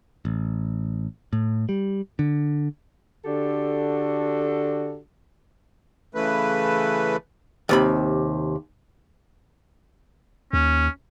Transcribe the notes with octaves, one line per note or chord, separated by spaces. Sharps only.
A1
A2
G3
D3
D3 D4 F#4 G4 A4
C#3 E3 A3 B4
D#2 C3 B5
D#2 C#4